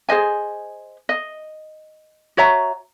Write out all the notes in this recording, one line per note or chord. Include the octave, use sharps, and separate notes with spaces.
G#4 C5 D#5 G#5
D#5
F#4 C#5 E5 A#5